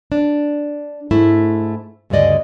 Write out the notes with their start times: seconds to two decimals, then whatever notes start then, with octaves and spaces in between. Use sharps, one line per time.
0.12 D4
1.11 G#2 A3 E4
2.10 D2 G2 C#3 G#3 D5 D#5